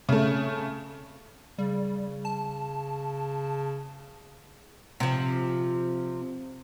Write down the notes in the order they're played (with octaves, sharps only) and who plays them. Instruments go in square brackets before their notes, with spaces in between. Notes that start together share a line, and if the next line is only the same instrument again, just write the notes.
[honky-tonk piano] C#3 A3
[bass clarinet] C#3 [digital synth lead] G3
[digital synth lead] A5
[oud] C3 F3